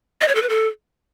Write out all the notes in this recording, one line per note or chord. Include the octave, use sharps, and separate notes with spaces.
D#5
C#5
A4
B4
A4